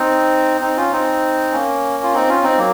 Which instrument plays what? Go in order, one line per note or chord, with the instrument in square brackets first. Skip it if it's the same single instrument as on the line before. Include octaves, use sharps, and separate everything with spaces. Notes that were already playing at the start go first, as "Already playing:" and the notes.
Already playing: [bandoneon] C4 D#4
C4 D#4
C#4 F4
C4 D#4
A#3 C#4
F4
C4 D#4
C#4 F4
C4 D#4
F#3 A#3